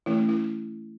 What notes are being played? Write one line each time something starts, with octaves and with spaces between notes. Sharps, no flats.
E3 A3 C#4 E4
E4